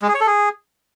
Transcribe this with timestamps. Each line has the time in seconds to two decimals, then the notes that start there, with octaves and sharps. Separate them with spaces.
0.02 G#3
0.08 G#4
0.14 C#5
0.21 A4
0.27 G#4